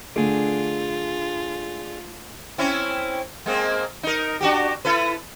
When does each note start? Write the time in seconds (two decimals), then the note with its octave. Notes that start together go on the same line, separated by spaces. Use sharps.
0.16 D3 A3 D4 F4 G#4
2.58 C4 C#4 E4
3.46 G#3 A#3 C4
4.03 D#4 A#4
4.41 D4 F#4 G4
4.85 E4 A4 B4